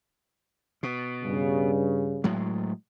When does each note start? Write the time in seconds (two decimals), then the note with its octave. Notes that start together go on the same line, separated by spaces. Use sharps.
0.83 B2
1.23 G2 C#3
2.24 A2 F#3 G#3